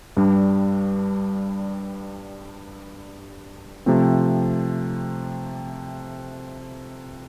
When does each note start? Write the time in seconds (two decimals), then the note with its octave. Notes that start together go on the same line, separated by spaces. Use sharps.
0.17 G2 G3 D4
3.86 C3 F3 A3 C4